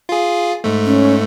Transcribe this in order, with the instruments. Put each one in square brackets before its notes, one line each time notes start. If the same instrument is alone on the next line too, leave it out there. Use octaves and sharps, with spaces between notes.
[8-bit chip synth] F4 G#4
G#2 A3
[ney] C#4